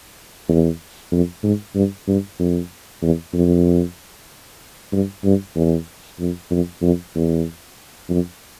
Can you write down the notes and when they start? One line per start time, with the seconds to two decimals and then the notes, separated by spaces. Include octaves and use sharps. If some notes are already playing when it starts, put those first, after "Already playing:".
0.48 E2
1.12 F2
1.43 G#2
1.75 G2
2.07 G2
2.39 F2
3.02 E2
3.33 F2
4.93 G2
5.24 G2
5.55 E2
6.20 F2
6.51 F2
6.82 F2
7.15 E2
8.09 F2